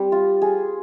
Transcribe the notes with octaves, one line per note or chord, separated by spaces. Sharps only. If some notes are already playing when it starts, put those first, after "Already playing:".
Already playing: G3 C4
F4
G#4